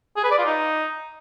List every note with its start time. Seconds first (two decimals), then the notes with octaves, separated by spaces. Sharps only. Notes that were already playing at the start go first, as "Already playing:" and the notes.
0.17 G#4
0.24 B4
0.31 D5
0.38 F4
0.45 D#4